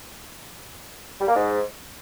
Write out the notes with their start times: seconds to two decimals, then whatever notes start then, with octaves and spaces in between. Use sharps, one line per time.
1.20 G3
1.28 A#3
1.35 G#2